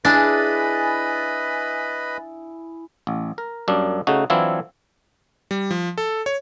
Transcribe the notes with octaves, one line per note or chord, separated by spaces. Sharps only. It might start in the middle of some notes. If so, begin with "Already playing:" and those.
D4 E4 G#4 B4 D#5 G#5 B5 A6
A1
A#4
F#2 G3 A#3 D4
C#3 A3 D#4 F#4
E3 F#3 C4 D4 E4 F4
G3
F3
A4
C#5